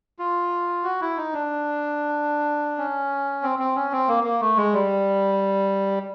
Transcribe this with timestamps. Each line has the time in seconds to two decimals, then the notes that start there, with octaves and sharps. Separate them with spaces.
0.19 F4
0.84 F#4
1.01 E4
1.17 D#4
1.33 D4
2.78 C#4
3.43 C4
3.59 C4
3.76 C#4
3.92 C4
4.08 A#3
4.24 A#3
4.41 A3
4.57 G#3
4.74 G3